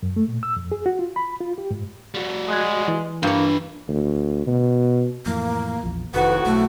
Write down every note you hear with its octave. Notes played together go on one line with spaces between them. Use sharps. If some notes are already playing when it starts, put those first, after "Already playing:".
F#2
A3
A#2
E6
F2
G#4
F#4
F4
B5
F4
G4
G#2
G3 F#4
G#3 D#6 F#6 G#6
E3
G2 A#3 F4 B4 C#5
D2
B2
F2 A2 E3 A#3
A#1 E2 F3
F1 F2 A2 D#3 F#4 B4
B1 A3